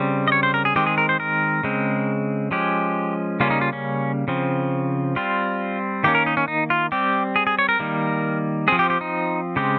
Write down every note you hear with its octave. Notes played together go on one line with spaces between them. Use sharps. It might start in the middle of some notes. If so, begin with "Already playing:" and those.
Already playing: C#3 G3 C4
D#5
C#5
C5
A#4
G#4
D#3 G#3 C4 G4
G#4
A#4
C5
A#4
C#3 G#3 C4
F3 G#3 C#4 G4
C#3 G3 A#3 C#4 F4
D#4
F4
C#4
C#3 F3 C4
G3 C4 F4
D#3 A#3 C#4 G4
A#4
D#4
C#4
D#4
F4
G3 C4 G4
G#4
G#4
C#5
A#4
D#3 G3 A#3
F3 C4 G#4
G4
G4
D#4
C#3 G#3 C4 G4